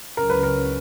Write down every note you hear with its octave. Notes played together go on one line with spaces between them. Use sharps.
C#2 C#3 F#3 C#4 A#4
B4
A#4